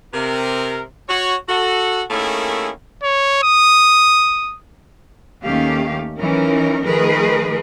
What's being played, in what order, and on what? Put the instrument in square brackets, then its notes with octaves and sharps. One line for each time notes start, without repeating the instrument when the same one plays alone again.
[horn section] C3 A#4
F#4 C#5
F#4 A4
D#3 A3 A#3 C#4 E4 G#4
[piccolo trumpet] C#5
D#6
[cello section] D#2 D#3 A3 C#4 G4 F5
E3 F#3 C#4 D#4 A#4
D#3 F3 A3 G#4 A#4 B4